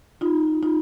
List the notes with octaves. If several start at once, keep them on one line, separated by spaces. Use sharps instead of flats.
D#4 F4
D#4 F4